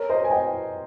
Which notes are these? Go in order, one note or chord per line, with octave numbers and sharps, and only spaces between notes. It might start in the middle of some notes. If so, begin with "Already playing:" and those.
Already playing: A#4 C#5
C5 D#5
G#5
D#5 G5